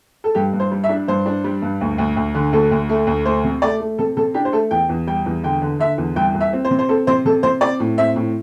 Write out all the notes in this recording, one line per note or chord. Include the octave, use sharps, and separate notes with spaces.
A4
G2 G4
G2
C5
G3
E5
D4
G2 C5
D4
G3
G2
D2
D2
D2
D3
D2 A4
D2
A3
D2
A3 C5
C3
A3 D5
A3
C3 A4
C3 A4
D4 G4
C5
A3 A4
E2 G5
E2
G3 G5
E2
D3 G5
D3
D3 E5
E2
C2 G5
C2
E5
C4
C5
C3
C5
C4 A4
C3 C5
C3 A4
C3 C5
C4 D5
A2
C4 E5
A2